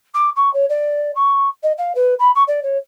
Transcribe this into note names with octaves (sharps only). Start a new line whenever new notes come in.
D6
C#6
C#5
D5
C#6
D#5
F5
B4
B5
C#6
D5
C#5